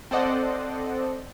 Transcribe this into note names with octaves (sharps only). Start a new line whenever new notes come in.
C4 A4 C5 D5 D#5 F#5